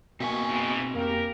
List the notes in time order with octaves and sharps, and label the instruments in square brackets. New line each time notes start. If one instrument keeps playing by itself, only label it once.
[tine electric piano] B2 A#3 C#6 [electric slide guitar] C4 E5 G#5
[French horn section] G#2 E3
[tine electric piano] F2 A#3 [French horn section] G4 A#4